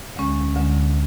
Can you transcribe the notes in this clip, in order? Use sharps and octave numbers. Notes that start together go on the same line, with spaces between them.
D2 D3 G#3 C#4
D2 D3 G#3 C#4